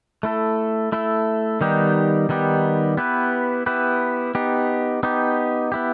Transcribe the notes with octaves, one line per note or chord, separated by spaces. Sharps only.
A3 E4 A4
A3 E4 A4
D#3 G3 B3 D#4 G4
D#3 G3 B3 D#4 G4
B3 E4 G4 B4
B3 E4 G4 B4
B3 D#4 G4
B3 D#4 G4
B3 E4 G4